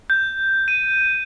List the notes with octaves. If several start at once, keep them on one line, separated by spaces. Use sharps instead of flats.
G6
D#7